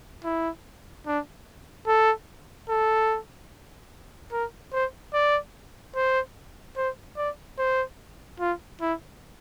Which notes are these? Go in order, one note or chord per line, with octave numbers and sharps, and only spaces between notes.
E4
D4
A4
A4
A#4
C5
D5
C5
C5
D5
C5
F4
E4